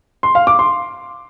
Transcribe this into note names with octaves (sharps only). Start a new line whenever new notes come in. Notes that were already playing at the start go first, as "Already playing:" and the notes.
C6
F5
D6
C6